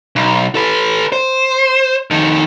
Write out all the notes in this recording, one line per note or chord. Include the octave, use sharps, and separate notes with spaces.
B1
A4 B4
C5
F2 D#3